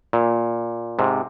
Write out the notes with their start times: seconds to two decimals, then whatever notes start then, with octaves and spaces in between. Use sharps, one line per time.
0.13 A#2
0.99 G#2 C3